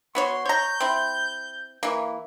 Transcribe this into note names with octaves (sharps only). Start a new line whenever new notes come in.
B3 F#4 C#5 C6
C#5 A#5 G6
C4 E4
E3 A#3